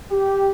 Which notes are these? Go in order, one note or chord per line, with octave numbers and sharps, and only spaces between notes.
G4